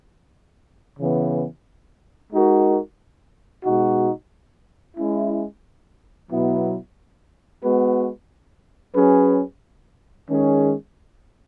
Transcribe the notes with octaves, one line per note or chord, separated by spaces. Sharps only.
C#3 E3 B3
G#3 D#4 F#4 A#4
B2 G#3 D#4 F#4
G#3 C#4 E4
B2 F#3 B3 E4
G#3 B3 F#4 B4
F#3 C#4 G#4 B4
D#3 G#3 C#4 G#4